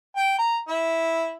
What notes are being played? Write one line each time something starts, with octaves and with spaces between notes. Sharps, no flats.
G5
A#5
E4